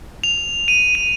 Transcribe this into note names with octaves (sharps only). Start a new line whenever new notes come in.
F7
D#7
D#7